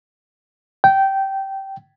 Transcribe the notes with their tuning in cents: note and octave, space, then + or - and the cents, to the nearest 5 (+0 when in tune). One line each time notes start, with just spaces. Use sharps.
G5 -15